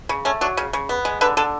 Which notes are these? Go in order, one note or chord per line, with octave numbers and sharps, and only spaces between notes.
C#3
A3 C#4
F#3 D4
C#3
C#3
B3
G#3
D3 B4
D3 A4